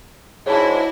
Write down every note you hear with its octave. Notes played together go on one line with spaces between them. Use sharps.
G#2 D4 E4 F#4 C#5 A5